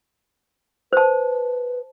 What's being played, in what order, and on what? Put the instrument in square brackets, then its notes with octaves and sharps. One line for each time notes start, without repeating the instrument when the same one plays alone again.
[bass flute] B4 [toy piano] C5 A5